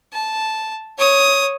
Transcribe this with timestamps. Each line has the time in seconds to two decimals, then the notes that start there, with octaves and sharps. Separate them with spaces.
0.13 A5
0.98 C#5 D#6